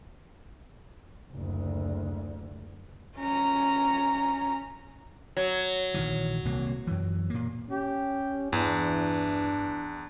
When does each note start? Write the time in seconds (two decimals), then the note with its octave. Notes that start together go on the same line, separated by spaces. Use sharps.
1.32 F#1 D2
3.18 C#4 A#5
5.37 F#3
5.94 A#1 D#3 E3
6.45 D#1 C2 A#3
6.87 F#2 E3
7.30 A#2 A#3
7.70 C#4 G4
8.53 E2 G2 E3 D4